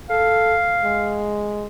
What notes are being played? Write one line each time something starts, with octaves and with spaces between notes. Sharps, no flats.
A4 F5
G#3